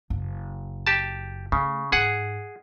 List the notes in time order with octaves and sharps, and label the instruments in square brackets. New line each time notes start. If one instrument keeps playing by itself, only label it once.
[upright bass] F#1
[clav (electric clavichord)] G4 A5
[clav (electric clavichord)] C#3 [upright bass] A3
[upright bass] G#2 [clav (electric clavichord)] G#4 F#5